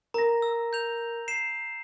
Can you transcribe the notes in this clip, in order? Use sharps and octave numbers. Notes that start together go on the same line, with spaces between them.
A#4 A#5 A#6
E6
G6 F7
C7 E7